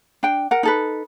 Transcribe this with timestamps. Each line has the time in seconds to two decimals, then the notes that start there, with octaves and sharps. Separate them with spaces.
0.23 D4 G5
0.51 A#4 F#5
0.63 D#4 A4 B4